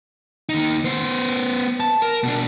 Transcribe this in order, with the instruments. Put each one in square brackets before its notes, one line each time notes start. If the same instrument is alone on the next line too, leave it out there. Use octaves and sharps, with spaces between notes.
[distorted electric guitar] D#2 D#4
B3 C5
A5
A#4
B2 D4